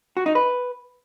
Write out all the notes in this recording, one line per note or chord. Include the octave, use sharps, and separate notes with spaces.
F#4
D#4
B4